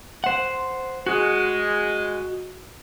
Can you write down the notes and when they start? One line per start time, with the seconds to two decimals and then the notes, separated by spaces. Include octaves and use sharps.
0.24 C5 F#5
1.06 G#3 F#4